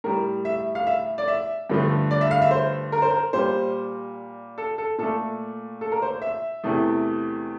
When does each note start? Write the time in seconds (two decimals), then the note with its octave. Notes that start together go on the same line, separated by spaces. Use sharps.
0.04 A2 G3 A#4
0.45 E5
0.75 F5
0.87 E5
1.18 D5
1.28 E5
1.70 G2 D3 F3 A3
2.11 D5
2.21 E5
2.31 F5
2.42 E5
2.51 C5
2.92 A#4
3.02 C5
3.11 A#4
3.33 A#2 G3 C5
4.58 A4
4.78 A4
4.98 A#2 A3 A4
5.81 A4
5.92 A#4
6.02 C5
6.22 E5
6.64 E2 C3 E3 A3